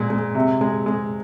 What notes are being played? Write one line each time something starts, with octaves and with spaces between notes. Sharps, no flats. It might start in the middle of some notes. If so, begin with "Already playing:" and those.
Already playing: A#2 G#3
G#3
C3
G#3
G#3